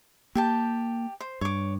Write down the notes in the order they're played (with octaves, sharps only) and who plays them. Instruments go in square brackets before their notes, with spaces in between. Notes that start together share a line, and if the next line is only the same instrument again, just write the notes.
[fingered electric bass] A#3 [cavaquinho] G4 G5 A5
[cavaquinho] C5
[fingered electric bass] G2 [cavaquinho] C#5 D6